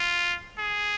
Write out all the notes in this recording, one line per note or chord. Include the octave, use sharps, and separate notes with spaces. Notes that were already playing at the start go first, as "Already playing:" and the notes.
Already playing: F4
G#4